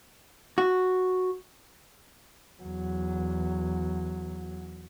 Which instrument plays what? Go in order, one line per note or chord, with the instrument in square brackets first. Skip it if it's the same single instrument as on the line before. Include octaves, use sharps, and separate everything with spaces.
[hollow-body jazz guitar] F#4
[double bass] E2 F#3